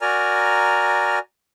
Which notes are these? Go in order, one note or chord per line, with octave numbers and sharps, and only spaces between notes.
F#4 A#4 D5 G#5 A#5 F6